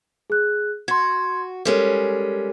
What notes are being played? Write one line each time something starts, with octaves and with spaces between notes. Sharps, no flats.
G#4 F#6
F#4 C6 G#6
G3 G#3 C#4 A4 A#4